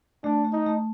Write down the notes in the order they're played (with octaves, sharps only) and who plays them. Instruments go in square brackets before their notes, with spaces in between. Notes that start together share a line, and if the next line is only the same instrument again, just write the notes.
[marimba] A3 [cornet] D4
[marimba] A3
[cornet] D#4
[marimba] A3